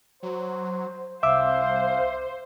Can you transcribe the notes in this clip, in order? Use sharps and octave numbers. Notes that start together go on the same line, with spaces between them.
F#3 C5
C2 C5 E5 F5 D6 E6